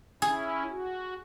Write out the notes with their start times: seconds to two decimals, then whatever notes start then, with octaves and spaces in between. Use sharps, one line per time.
0.22 C#4 E4 G#4
0.69 F#4